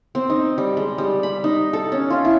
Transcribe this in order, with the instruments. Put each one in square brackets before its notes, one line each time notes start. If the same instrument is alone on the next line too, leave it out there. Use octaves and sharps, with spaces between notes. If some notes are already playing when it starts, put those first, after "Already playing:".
[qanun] C4
D#4
G3
G#3
G3
B5
D#4
A4
C#4
F4
E4